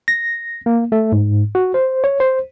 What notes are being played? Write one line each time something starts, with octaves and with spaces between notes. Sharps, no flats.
A#6
A#3
A3
G#2
F#4
C5
C#5
C5